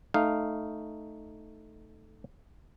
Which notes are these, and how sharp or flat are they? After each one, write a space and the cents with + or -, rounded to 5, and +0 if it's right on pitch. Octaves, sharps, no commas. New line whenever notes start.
A3 +0 D#4 -5 F5 +0